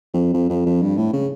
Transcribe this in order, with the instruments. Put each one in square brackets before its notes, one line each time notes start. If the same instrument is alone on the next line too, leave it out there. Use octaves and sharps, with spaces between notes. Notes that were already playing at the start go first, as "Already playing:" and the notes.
[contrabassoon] F2
F2
F2
F2
G2
A2
C#3